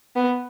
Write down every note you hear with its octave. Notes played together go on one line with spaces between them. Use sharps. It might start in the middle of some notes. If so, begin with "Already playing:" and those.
B3